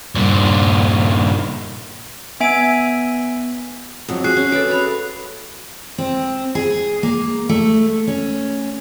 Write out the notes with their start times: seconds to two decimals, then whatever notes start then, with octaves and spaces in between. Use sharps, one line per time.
0.15 G2 A#2
2.40 B3 E5 G#5 D7
4.08 F2 F#3
4.24 F#4 G#4 F#6 C7
4.37 C#4
4.52 A4 B4 C#5 E5 A5 D6
4.68 A#5 B5
5.98 C4
6.55 G#4
7.03 A#3
7.49 A3
8.07 C#4